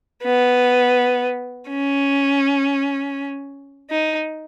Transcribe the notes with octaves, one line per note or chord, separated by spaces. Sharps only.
B3
C#4
D#4